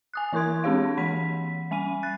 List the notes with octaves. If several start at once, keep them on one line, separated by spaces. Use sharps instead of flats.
G#5 D#6 F#6
E3 E4 A#4 C6 G#6
G#3 C4 D4 G4 C#5 F5
E3 F#5 B5 B6
G3 G#5 B5 D#7
F#6 A6